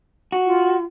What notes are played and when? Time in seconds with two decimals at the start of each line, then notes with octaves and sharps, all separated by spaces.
0.32 F#4
0.46 F4